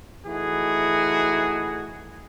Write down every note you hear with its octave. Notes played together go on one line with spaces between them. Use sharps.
E3 A3 D#4 F#4 G#4